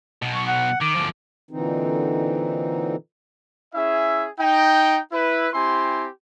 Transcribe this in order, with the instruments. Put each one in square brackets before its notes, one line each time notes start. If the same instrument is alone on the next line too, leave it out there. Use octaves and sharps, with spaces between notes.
[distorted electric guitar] B1 B2
[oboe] C#6
F#5
[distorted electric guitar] D#3 [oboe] D6
[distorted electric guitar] D2 F3
[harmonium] A#2 D3 E3 C4 D#4
[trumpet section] C#4 E4 G#4 E5
D#4 G5
E4 B4
C4 E4 G4 G#5 C6